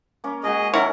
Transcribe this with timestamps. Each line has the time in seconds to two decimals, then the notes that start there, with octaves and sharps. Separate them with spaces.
0.24 A#3 C#4
0.44 G#3 F#4 G#4 D#5
0.74 D#3 C#4 E4 A4 A#4 C#5 F#5